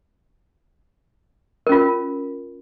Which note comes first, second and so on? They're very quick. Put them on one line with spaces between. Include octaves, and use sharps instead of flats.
A#4 C#4 F4